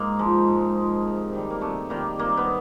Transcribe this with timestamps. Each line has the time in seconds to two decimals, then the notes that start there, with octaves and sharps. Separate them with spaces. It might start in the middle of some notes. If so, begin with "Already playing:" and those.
Already playing: G#2 A#3 D#4
0.19 F3 G#3
0.47 G#2
0.75 F3 G#3
1.05 C3
1.33 D#3 G3
1.50 A#3
1.61 C3 A3
1.90 D#3 G3 A#3
2.19 C3 A#3
2.37 B3